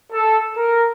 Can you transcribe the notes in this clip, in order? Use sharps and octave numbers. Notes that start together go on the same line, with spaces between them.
A4
A#4